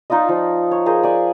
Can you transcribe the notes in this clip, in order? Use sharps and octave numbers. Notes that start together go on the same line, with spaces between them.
D#4 F4 D5 D#5
F3
C#5
F4 G#4 A#4 C5
D5 G#5 B5